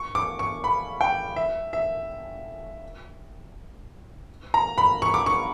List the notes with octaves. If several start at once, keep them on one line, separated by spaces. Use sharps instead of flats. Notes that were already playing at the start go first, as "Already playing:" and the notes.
Already playing: C#6
D6
C#6
B5
G5
E5
E5
A#5
B5
C#6
D6
C#6